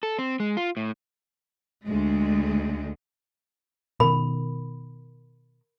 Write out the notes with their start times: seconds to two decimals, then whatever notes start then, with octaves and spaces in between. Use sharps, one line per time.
0.03 A4
0.19 C4
0.40 G#3
0.57 F4
0.77 A2
1.85 D2 G#3
4.00 B2 D#3 A#4 B5